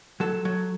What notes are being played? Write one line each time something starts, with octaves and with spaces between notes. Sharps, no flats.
F#3 A4
F#3